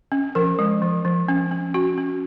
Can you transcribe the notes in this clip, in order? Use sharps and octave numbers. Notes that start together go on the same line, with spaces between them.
C#4
F3 A#4
G#3
F3
F3
C#4
C#4
C#4 F#4
C#4